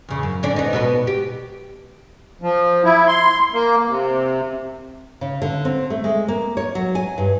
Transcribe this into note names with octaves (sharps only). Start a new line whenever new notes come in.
E2 C#3
F#2
D3 C#4 D4
B3 D#4
B2 B3 B4
G4
F3
E4
C6
A#3
C3
C#3
D3
C4
A3
G#3
A#3
C#5
F#3
G#5
G2